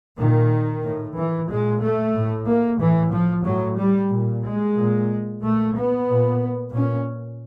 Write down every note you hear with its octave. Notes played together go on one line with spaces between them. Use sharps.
A#2 D#3
A2
E3
A#2 G#3
A3
A2
A#3
A2 E3
F3
A2 F#3
G3
A#2
G#3
A#2
A#2 A3
B3
A#2
A#2 C#4